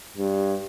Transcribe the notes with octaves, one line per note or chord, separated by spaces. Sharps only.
G2